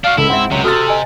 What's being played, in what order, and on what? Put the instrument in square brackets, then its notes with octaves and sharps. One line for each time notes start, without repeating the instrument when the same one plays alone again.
[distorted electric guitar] D4 F#4 [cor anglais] F5
[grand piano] C#2 [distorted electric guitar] E4 [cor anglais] A4
[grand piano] G#2 [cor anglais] C4 [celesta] E5 F#5
[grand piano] C#2 [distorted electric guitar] C3 [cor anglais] F#3
[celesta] F#4 [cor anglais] A4 [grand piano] D#6 F6 A6
[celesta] D#5 G#5 A5